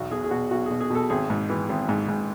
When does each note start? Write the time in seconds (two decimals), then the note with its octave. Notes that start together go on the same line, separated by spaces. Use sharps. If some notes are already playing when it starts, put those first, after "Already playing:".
Already playing: B1 E2 F#4
0.11 B2 G#4
0.24 G#4
0.31 B2 F#4
0.51 B1 F#4
0.66 B2 G#4
0.81 G#4
0.90 B2 A4
1.10 G#1 G#4
1.30 G#2
1.50 E3
1.69 G#1
1.89 G#2
2.09 G#2